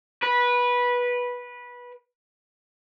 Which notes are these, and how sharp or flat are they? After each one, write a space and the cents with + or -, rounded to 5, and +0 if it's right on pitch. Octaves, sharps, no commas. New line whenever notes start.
B4 -15